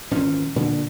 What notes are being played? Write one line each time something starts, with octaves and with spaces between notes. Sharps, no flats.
G#1 A#2 E3 C#4
A#2 D3